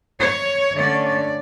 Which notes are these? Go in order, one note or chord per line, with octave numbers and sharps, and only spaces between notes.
C#5
D3 A3 C#4 D5
D5